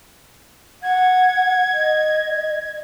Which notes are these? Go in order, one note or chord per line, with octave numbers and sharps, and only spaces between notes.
F#5 G#6
D#5